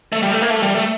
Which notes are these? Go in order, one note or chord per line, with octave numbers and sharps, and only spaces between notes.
A3
G3
A3
A#3
A3
G3
A3